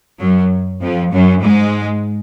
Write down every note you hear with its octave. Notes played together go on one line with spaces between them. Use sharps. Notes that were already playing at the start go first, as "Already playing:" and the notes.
F#2 F#3
F2 F3
F#2 F#3
G#2 G#3